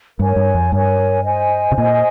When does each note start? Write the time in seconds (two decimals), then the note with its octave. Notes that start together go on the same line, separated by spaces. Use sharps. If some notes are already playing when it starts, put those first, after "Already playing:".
0.19 G2 A#4 C#5 G#5
0.36 G2
0.54 F2
0.72 G2 A#4 C#5 G#5
1.24 C5 D#5 G#5
1.72 C3
1.77 A#2 C5 D#5 G#5